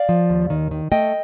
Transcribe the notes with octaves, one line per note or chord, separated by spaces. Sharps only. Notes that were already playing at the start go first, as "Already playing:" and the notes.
Already playing: D5 F5
F3
D#2
D#3
D#3
A3 D#5 G5